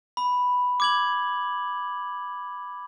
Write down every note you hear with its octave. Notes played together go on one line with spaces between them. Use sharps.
B5
D6 G#6 F#7